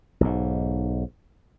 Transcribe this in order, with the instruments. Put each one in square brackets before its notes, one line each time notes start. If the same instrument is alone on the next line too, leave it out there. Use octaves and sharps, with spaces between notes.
[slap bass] B1 G#2